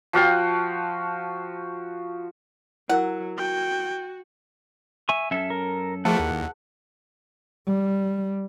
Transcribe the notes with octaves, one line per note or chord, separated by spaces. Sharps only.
F3 F#4 F5 G5
F#3 E4 A#4 F#5 E6
F#4 G5
E5 G#5 C#6
F#2 C#4 A4 E5
A#4
F3 A3 E4 G#4 A#4 B4 F#5 A5
D#2
G3